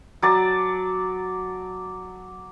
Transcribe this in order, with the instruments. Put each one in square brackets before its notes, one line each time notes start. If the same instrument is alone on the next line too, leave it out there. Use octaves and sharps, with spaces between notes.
[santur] F#3 D5 A5